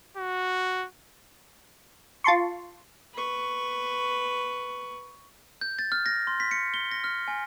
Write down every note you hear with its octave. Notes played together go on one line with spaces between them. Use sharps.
F#4
F4 A5 C6 C#6
B4 C#6
G6
A6
F6
A#6
C6
B6
C#7
G7
A#6
F6
G#5